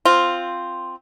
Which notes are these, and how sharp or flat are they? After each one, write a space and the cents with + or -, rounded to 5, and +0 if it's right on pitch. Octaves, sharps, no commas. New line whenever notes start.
C4 +0 F4 +0